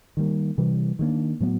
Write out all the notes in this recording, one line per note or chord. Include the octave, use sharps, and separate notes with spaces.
D#3 G3 A#3
C3 E3 G3
D#3 F#3 A#3 D4
A2 F#3 B3